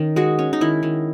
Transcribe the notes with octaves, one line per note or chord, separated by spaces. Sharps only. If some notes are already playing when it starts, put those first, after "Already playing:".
Already playing: D#3 C#4
G#3 F#4
C#4
D#4
D#3 E4
D#3